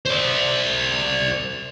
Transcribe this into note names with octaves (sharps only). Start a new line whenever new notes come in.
C5 D5